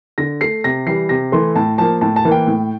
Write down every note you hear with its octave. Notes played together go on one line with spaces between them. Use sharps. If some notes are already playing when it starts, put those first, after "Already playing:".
D3 A#6
A3 C7
C3 A#6
E3 G3 C7
C3 A#6
E3 A3 C6
A2 A5
F3 A#3 A5
A2 A5
A5
E3 A#3
G5
A2